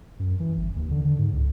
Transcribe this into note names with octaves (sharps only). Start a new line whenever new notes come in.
F#2
E3
G1
D#2
D3
D3
G#2
C#2